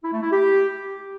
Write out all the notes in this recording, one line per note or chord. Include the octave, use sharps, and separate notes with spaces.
E4
A3
E4
G4